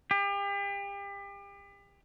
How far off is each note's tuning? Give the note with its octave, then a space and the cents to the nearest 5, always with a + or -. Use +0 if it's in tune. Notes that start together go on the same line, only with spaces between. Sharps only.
G4 +35